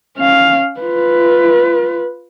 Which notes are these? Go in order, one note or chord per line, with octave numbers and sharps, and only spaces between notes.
C#4 F5
F4 B4